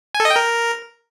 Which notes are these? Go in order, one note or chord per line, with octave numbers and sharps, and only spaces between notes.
G#5
A4
D#5
G5
A#4